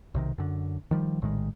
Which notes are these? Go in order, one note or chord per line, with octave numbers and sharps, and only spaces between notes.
B1 C3 D#3
F#2 D3
D#3 F3 G3
A#1 A2 D#3 G#3